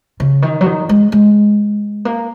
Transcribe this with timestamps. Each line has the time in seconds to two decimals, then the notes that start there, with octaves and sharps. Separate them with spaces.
0.20 C#3
0.42 D#3
0.61 F#3
0.66 D#3
0.89 G#3
1.12 G#3
2.05 A#3